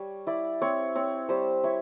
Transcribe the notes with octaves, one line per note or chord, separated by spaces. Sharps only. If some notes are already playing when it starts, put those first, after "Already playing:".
Already playing: G3 C#5
E4 D5
C4 C#5
C4 C#5
G3 C5
E4 C#5